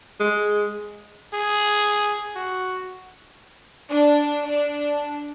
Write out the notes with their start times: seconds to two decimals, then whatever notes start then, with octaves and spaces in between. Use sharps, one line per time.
0.20 G#3
1.34 G#4
2.36 F#4
3.89 D4
4.44 D4